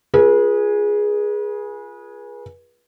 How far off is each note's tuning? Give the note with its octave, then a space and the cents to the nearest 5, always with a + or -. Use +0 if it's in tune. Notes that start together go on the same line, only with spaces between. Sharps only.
F4 +0 G#4 +0 B4 -35